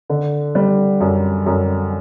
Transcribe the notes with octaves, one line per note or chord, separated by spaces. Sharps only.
D3
G3
F#2
F#2